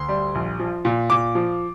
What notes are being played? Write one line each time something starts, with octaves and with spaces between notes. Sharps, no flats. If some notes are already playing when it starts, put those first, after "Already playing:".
Already playing: D2 C6
G3
A#1
F3
A#2
A#2 D6
F3